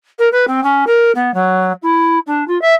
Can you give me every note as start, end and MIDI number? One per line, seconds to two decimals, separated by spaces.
0.19 0.29 70
0.32 0.45 71
0.48 0.63 60
0.64 0.85 61
0.87 1.12 70
1.15 1.34 59
1.34 1.73 54
1.83 2.19 64
2.27 2.47 62
2.48 2.61 65
2.62 2.75 76